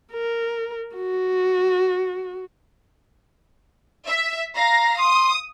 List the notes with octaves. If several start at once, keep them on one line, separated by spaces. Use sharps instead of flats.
A#4
F#4
E5
F5 A#5 A#6
C6 D#6